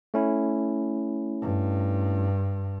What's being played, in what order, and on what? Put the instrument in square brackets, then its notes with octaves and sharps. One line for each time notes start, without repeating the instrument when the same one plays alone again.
[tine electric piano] A3 C#4 E4
[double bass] G2